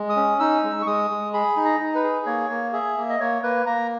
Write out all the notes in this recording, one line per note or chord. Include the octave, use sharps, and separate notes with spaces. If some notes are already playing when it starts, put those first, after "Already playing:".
Already playing: G#3
D#6
C#4
D#4 E6
G#3
C#6
G#3 D#6
G#3
G#4 B5
D#4
A#5
D#4
B4
G#4
A#3 C#5
A#3
G#4 E5
A#3
D#5
A#3 C#5
A#3 B4
A#3 A#5